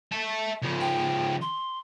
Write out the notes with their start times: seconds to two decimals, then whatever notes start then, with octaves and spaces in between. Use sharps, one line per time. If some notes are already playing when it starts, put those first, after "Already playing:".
0.12 E5 A5
0.62 C#3 F3
0.81 G5
1.41 C6